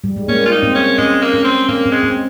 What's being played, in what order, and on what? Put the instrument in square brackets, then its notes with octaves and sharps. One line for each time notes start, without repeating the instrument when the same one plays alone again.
[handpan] G3
G#3
[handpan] A#3 [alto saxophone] C#4
[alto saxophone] F4
D#4
[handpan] C4
[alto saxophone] C#4
[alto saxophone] G#3 [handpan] C#4
[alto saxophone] A#3
[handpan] C#4
[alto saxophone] C4
[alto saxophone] A#3 [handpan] C4
[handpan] C4
[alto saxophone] G#3
[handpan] C4